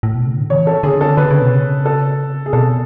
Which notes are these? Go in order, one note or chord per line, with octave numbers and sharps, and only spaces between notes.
A2
B2
C#3
D3
E3 C#5
A4
D3 G#4
A4
D3 B4
C#3
B2
C#3
A4
G#4
B2 A4